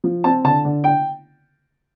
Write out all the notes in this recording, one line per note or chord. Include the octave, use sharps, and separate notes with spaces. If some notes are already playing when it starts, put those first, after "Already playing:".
F3
C4 A5
D3 A5
D3
G5